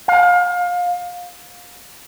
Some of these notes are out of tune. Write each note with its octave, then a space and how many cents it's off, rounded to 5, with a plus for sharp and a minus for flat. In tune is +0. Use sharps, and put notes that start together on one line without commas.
F5 +30